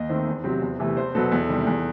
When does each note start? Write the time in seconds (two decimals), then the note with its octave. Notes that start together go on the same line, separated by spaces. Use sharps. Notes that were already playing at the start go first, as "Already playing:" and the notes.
Already playing: D#2 D#5
0.09 D#3 A3 C4 C5
0.27 E2
0.44 C3 F#3 C4
0.61 E2
0.79 C3 E3 A3
0.97 E2 C5
1.15 B2 F#3 B3 A4
1.31 E2 A4
1.49 C3 D#3 G3
1.66 E2